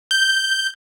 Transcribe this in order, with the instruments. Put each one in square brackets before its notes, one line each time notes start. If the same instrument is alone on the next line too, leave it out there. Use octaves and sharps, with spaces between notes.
[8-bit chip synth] G6